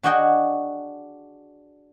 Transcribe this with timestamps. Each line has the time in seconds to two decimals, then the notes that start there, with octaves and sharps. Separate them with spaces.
0.03 D4 F#4 G#4 D#5 F#5 G5